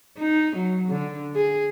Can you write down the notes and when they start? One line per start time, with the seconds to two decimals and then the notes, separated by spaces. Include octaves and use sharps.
0.18 D#4
0.56 F#3
0.89 D3
1.35 G#4